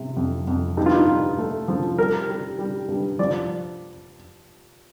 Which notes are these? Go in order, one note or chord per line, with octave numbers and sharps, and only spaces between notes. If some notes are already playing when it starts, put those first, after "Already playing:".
Already playing: C3
F2
F2
G2 D#4
F4
D#4
G2
A3
F3
G3 A#4
G3
G3
G2
F3 D5